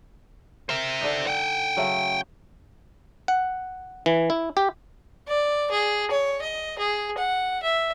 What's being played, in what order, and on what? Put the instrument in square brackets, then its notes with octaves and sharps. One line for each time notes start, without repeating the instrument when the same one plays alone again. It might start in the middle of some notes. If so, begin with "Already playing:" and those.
[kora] A#4 [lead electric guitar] C5 E5
[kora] D3 D4 D#4
[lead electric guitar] F#5 G5
[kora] C#3 F#3 A3
[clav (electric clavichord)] F#5
E3
E4
G4
[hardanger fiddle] D5
G#4
C#5
D#5
G#4
F#5
E5